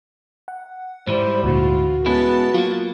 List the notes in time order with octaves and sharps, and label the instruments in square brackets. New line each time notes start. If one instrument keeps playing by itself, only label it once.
[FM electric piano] F#5
[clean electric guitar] G#2 E3 E4 [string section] G3 [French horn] C5
[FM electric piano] D2 A#2 D3 [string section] F4 [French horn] F#4
[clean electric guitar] G#3 C#4 E4 [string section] B3 A5
[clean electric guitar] F#3 A#3 [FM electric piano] F4